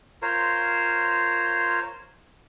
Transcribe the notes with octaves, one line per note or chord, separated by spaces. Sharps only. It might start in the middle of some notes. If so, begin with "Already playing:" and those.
F4 A#4 C5 C#5